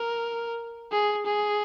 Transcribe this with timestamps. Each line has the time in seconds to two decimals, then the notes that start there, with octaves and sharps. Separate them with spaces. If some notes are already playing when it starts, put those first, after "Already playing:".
Already playing: A#4
0.92 G#4
1.26 G#4